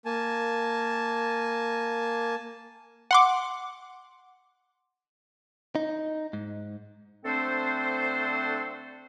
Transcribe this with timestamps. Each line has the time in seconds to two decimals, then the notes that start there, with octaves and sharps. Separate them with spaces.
0.05 A#3 G#5 A5
3.11 F#5 C6 D6
5.75 D#4
6.33 G#2
7.25 D3 A3 C4 D4 A4 C5